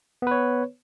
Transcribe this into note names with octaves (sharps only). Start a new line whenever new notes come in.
B3 B4 C#5